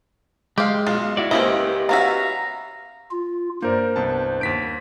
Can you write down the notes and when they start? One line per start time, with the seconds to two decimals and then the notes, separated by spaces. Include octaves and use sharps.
0.58 G#3 G4 F5 C6
0.87 B1 F4
1.17 E4 F#4 D5
1.31 C#2 A#3 C4 C#4 E4 G4 B4 D#5
1.89 B3 C#4 F#4 E5 F5 A#5
3.11 F4
3.62 G2 A#3 A#4 C5 D5
3.96 C2 B3 A5
4.41 D#2 B6 D7